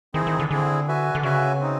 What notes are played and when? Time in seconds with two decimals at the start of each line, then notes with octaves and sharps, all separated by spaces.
0.14 D#3 C4 E4 G#4
0.27 D#3
0.39 D3
0.50 D3 C4 E4 G#4
0.88 F#4 B4 E5 G#5
1.15 D3
1.23 C#3 F#4 B4 E5 G#5
1.60 C4 D#4